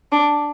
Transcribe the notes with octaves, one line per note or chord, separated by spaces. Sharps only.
D4